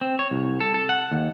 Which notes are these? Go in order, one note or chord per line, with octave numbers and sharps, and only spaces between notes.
C4
C#5
C2
A4
A4
F#5
D#2